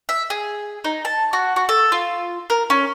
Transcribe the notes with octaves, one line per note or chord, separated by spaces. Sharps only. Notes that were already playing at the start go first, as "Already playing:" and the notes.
E5
G#4
D#4
A5
F#4
F#4
A4
F4
A#4
C#4